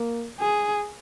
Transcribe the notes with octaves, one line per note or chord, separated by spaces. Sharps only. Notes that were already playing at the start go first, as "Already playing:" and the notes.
Already playing: A#3
G#4